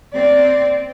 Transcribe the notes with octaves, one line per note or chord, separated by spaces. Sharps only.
C4 D5